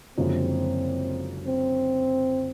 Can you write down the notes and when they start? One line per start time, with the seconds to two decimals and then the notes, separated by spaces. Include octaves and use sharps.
0.17 F#1 F#2 D3 F3 G#3 C4
1.47 C4